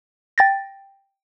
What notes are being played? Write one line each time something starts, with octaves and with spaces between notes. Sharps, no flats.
G5 A6 A#6